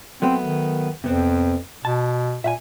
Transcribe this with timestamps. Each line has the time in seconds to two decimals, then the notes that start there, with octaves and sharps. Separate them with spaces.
0.22 F#3 A3 B3 C4
0.44 D#3
1.04 F2 C3 B3 C4
1.85 B2 A5
2.44 A#2 E5 F#5 G#5